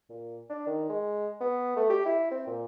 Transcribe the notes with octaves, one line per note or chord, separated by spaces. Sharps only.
A#2
D4
D#3
G#3
B3
A3
G4
E4
C4
A#2